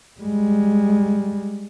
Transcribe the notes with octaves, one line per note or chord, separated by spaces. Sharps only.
G3 G#3